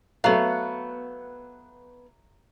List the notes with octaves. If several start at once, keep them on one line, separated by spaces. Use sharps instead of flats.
F#3 A3 B3 F5